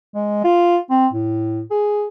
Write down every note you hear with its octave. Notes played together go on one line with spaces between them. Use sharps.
G#3
F4
C4
A2
G#4